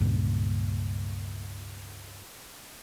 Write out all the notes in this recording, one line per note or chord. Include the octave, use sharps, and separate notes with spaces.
C#2 G2 A#2